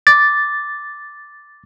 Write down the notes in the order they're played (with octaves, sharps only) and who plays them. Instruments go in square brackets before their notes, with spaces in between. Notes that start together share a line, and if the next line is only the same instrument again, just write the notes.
[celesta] D6 [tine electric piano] A6